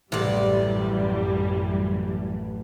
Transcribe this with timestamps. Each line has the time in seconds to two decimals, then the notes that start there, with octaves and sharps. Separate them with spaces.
0.12 A1 F#2 C3 E3 G3 D5